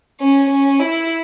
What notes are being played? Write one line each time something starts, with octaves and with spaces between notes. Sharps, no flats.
C#4
C#4
E4